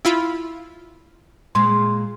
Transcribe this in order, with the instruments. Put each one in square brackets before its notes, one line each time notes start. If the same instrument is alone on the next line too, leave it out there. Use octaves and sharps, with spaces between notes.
[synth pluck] E4 F4 B5
[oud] A#2 G#3 [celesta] C6